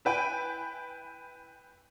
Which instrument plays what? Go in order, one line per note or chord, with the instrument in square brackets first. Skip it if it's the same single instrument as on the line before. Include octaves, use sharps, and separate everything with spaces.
[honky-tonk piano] E4 B4 G5 G#5